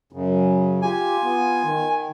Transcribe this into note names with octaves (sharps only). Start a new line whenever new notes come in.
F#2 C#3
F4 G4 G#5
B3 F4
D#3